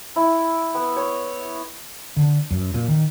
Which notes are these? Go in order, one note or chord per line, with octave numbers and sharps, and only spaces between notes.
E4
B3
C#5
D3
F#2
A#2
D#3